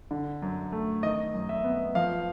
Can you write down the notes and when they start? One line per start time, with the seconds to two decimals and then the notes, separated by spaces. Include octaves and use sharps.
0.11 D3
0.42 F#2
0.72 A3
1.03 D#3 D#5
1.34 F#2
1.49 E5
1.64 B3
1.95 F3 F5